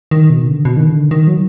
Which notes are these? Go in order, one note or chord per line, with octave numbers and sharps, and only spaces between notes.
D#3
B2
D3
B2
D#3
D3
D#3
F#3